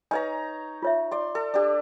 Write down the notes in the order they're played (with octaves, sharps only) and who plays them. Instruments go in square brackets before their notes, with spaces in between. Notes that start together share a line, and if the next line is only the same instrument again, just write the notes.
[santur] D#4 C#5 A#5 [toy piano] B4 G#5
[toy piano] F4 C#5 E5
[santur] D5 C6
A4
D4 G4